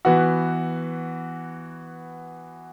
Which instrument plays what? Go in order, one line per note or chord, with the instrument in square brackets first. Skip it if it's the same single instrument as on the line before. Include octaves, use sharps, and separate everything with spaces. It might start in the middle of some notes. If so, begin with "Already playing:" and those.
[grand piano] E3 B3 F#4